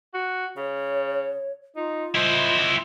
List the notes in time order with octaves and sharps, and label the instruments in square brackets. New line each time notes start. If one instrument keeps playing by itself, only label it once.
[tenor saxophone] F#4
[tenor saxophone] C#3 [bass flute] C#5
[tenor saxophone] D#4 [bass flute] F4
[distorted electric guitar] E4 C5 [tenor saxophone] D#5